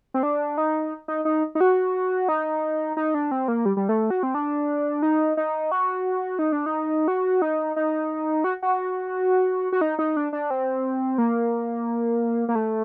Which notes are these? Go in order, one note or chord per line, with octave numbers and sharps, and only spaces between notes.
C4
D4
D#4
D#4
D#4
D#4
F#4
D#4
D#4
D4
C4
A#3
G3
G3
A3
F#4
C4
D4
D#4
D#4
F#4
D#4
D4
D#4
F#4
D#4
D#4
F#4
F#4
F#4
D#4
D#4
D4
D4
C4
A#3
A#3
A3